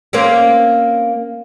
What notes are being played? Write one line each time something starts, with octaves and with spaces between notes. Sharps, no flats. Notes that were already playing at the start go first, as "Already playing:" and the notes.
A#3 C4 C#4